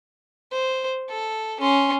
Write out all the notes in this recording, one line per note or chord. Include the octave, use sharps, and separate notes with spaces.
C5
A4
C#4 C6